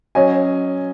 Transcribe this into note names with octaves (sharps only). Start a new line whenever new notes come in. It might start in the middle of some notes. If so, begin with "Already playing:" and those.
F#3 C#4 D#5 G#5